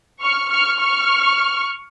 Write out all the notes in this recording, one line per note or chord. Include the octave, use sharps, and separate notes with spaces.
C#6 F6
C#6 F6
C#6 F6